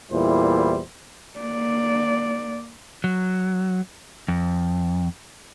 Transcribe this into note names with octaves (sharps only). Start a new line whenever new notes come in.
E2 A#2 G3 E4 C5
A#3 D5
F#3
F2